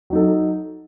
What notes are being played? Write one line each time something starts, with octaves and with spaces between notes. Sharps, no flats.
F#3 D#4 A4